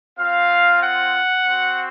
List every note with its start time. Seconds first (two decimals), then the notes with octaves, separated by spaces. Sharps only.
0.18 C4 F4 F5
0.82 F#5
1.46 C4 F#4